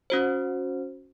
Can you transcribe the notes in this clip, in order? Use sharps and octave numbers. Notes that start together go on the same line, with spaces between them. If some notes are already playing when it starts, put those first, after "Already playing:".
C#4 F#4 C5